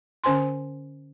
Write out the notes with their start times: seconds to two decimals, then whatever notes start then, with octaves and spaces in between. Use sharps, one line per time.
0.24 D3 C#4 C5 G#5 C6